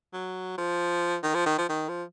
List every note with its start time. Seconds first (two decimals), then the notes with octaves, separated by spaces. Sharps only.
0.13 F#3
0.58 F3
1.23 D#3
1.34 F3
1.46 D#3
1.58 F3
1.70 D#3
1.89 F3